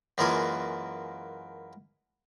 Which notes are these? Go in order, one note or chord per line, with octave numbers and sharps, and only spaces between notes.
F#2 E3 G#3 A#3 F4 G#5